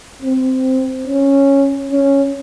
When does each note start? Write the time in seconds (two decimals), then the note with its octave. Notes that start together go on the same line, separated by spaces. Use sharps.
0.22 C4
1.07 C#4
1.92 C#4